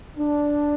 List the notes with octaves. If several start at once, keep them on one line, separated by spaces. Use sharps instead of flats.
D4